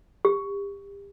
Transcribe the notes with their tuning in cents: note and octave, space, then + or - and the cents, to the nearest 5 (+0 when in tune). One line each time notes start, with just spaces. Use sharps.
G4 +30